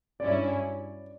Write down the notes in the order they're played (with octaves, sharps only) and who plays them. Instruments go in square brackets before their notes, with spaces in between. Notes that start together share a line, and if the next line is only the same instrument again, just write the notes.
[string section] G2 F#3 C#4 E4 [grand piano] D5